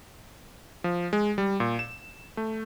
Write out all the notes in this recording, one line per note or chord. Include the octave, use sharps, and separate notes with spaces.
F3
G#3
G3
A#2
E7
A3